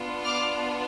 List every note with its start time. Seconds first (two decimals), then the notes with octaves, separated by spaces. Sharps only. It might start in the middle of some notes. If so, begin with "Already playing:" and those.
Already playing: B3 D4 F4
0.24 D6 F6